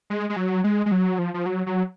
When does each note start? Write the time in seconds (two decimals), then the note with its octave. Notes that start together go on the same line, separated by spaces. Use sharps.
0.10 G#3
0.30 G#3
0.36 F#3
0.64 G#3
0.86 G#3
0.92 F#3
1.19 F3
1.34 F3
1.46 F#3
1.66 F#3